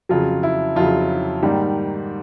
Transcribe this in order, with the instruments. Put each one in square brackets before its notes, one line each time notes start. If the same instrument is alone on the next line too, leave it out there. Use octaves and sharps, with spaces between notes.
[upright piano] F2 C#3 F#3 F4
E4
F2 C#3 F#3 F4
G#2 D#3 G3 A#3